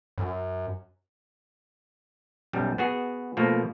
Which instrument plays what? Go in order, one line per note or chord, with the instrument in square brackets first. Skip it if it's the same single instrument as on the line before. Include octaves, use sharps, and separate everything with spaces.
[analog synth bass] F#2
[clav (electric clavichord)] B1 F#2 G3
B3 F#4 G#4
B2 F3 A3 A#3